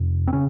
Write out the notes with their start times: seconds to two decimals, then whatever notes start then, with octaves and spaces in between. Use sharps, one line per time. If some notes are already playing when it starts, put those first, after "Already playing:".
Already playing: F2 C3
0.27 C4
0.33 C#3 C#4